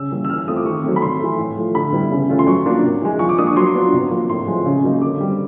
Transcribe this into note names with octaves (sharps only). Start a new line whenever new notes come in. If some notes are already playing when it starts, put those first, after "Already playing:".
Already playing: C#3 E6
E3 G3 A#3 C#4
E6
E3 F6
E6
A3 C4 F4 D#6
D6
D#3 C#6
F#3 A3 C4
B5
C3 C6
E3 A3
A2
F3 A3
D3 B5
G3 B3 E4
C#3
E3 A3 C#4 F4
C6
F#3 C#6
A#3 D4 F4
C3
E3 G#3
F3 C#6
D6
A#3 D4 D#6
C#6
F#3 C6
B3 D4 F4
C3
F3 A#3
A2 C6
F3 G#3 C4
C#3
F#3 A#3 D#4
D3 D6
G3 C4